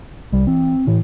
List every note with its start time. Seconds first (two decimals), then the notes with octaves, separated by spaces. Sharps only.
0.32 C2 G3
0.47 E3 C4
0.87 A2 E3